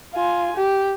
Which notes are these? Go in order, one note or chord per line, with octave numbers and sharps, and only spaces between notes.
F4 G#5
G4